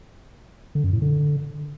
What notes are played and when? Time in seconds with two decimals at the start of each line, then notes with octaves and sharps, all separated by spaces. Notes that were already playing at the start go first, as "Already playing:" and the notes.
0.75 D3
0.84 F#2
0.93 A2
1.02 D3